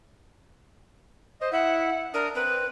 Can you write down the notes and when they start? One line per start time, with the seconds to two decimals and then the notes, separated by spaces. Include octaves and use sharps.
1.41 C5 D#5
1.52 E4 E5 F#5
2.14 D4 A#4 D#6
2.35 C4 B4